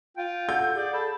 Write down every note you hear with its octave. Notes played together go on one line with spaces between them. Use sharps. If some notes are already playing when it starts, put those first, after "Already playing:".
F4 G5
A4 F#5 G6
G#4 D5
A4 B5